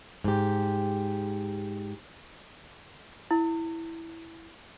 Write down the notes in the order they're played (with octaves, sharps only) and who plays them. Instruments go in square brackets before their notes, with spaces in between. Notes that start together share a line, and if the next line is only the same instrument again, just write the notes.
[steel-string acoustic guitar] G#2 G4
[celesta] E4